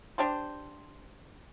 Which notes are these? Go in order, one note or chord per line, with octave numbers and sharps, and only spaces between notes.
D4 G4 C5